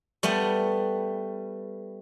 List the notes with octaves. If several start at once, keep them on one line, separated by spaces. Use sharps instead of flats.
G3 A3 B3